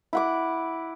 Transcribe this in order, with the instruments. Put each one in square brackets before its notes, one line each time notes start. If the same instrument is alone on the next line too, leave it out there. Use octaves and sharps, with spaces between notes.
[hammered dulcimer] E4 F#5 D6